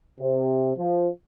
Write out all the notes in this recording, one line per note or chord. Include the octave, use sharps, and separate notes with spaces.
C3
F3